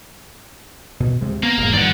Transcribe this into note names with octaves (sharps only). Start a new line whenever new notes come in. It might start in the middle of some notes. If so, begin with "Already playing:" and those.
B2
D2 C3 G#3
A#3 B3
E1 G#2
G2 D#3 F3 D5 F#5